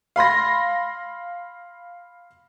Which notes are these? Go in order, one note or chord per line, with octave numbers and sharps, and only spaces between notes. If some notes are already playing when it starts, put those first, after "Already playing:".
F5 B5 C6 A#6